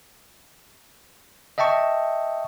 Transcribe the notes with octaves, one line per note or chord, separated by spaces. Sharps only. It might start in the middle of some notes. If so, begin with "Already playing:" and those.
D#5 E5 G5 A5 C#6